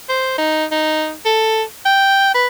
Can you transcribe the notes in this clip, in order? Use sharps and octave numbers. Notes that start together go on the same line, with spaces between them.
C5
D#4
D#4
A4
G5
B4